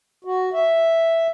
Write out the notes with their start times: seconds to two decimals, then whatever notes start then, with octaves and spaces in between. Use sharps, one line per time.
0.24 F#4
0.53 E5